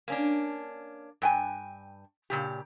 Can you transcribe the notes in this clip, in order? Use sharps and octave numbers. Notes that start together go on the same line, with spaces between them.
A#3 C#4 D4
G2 G5 G#5
A#2 C#3 G4